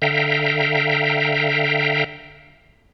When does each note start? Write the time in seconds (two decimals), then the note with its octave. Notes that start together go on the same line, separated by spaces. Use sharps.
0.02 D3 E5 F5 G5 A#5